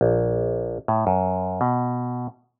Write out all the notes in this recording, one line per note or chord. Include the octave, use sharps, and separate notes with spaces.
A#1
A2
F#2
B2